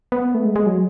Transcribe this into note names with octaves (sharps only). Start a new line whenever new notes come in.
B3
A3
G#3
G#3
F#3